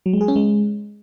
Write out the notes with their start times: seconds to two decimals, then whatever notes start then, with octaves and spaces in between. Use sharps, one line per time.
0.06 F#3
0.13 G#3
0.21 G#4
0.28 C#4
0.36 G#3